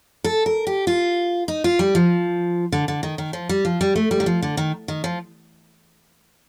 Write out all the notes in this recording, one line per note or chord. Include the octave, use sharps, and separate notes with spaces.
A4
A#4
G4
F4
D#4
F4
G3
F3
D3
D3
D#3
D#3
F3
G3
F3
G3
A3
G3
D#3
F3
D3
D#3
D#3
F3